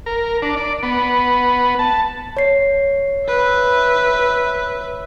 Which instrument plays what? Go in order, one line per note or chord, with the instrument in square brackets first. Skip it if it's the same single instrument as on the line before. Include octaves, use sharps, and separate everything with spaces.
[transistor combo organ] A#4
D4
D5
B3
A5
[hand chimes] C#5 C7
[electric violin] B4 E5